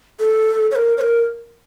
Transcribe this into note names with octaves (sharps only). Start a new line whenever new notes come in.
A4
C#5
A#4
C#5
A#4